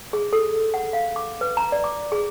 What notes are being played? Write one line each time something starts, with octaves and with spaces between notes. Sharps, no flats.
G#4
A4
F#5
F5
D6
B4
A#5
D5
D6
G#4